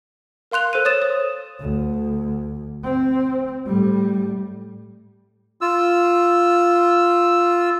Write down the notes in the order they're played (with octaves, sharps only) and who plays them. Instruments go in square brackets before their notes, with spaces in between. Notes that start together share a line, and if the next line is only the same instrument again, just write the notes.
[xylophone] A#4 F5 C6 F#6 F7
A4 C5 F#6 D#7
C#5 D#6 A6 E7
D#6
[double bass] D2
C4
A2 G3
[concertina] F4 E6